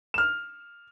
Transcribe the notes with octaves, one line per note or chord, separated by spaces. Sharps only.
F6 E7